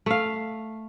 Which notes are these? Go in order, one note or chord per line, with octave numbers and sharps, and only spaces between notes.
A3 F5